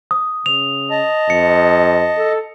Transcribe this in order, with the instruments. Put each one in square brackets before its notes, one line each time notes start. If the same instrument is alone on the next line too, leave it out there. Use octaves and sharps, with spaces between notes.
[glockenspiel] D#6
[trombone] C#3 [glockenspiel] F7
[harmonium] D#5 A5
[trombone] F2 [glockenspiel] C#7
[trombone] A4